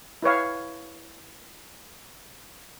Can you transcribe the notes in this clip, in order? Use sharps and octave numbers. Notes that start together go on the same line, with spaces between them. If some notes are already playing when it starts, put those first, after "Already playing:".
E4 B4 C#5 F5